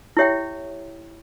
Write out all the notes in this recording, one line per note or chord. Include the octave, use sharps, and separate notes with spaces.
E4 G4 C#5 E5 G5